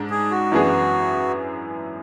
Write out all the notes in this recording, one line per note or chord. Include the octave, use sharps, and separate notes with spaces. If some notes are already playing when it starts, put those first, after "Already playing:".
Already playing: G#2 G#3 D4
G#4
F#4
F#2 E3 B3 D4 G#4